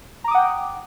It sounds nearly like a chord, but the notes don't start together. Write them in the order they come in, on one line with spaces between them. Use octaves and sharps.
A#5 D6 D#6 F#5 G5